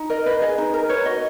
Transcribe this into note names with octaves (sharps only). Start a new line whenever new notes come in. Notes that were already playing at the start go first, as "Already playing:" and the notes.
Already playing: D#4
A#4 D#5
B4 D#5
G#4 D#5
D#4 D#5
A#4
B4 C#5
F#4 D#5